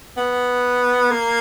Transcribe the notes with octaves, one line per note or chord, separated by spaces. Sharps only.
B3
A#3